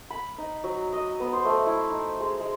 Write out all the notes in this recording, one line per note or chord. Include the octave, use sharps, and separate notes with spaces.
B5
D#4
F#3
D#5
B3
C5
A3
E4
D#4
G#3
G#3